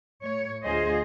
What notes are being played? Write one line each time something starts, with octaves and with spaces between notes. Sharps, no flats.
A2 C#5
D2 F4 G#4 C5 D#5